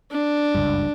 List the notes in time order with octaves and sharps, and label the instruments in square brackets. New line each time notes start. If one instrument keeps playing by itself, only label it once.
[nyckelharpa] D4
[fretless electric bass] F#1 C#2 G2